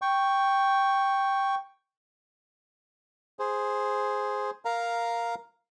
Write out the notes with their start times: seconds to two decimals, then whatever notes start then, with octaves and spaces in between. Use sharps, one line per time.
0.02 G5 C#6
3.39 G#4 C5
4.65 A#4 F5 A#5